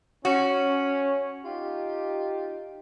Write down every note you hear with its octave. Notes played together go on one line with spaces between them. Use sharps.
C#4 F#4
D#4 F4 G4